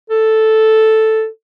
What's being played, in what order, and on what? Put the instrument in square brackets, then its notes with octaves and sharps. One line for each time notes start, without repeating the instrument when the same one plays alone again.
[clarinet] A4